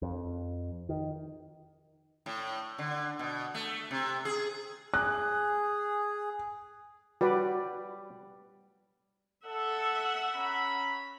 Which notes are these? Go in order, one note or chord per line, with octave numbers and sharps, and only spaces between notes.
F2
D#3
A2
D3
B2
A3
C3
G#4
G#4 F#6
G3 F#4 B4 D5
A4 E5 F#5
C#4 A#5 B5